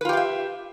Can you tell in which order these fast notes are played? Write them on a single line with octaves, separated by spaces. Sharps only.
B4 F4 G4 F5 E5